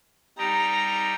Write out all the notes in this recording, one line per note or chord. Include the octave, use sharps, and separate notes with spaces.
G3 D#4 G4 A#5